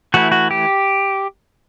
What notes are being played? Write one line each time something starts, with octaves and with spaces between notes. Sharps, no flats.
E3 A3 E4 F#4
F#4
G4